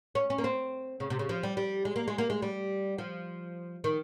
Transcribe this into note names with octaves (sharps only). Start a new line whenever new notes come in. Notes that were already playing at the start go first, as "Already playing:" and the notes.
C#4
C#4
A#3
C4
C#3
C3
C#3
F3
G3
G3
G#3
A#3
G#3
A#3
G#3
G3
F3
D#3